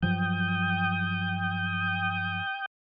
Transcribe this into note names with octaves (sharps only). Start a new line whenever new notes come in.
G2 F3 F#3 G5 D#6 G6